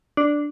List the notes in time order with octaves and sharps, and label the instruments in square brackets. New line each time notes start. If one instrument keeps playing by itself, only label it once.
[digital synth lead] D4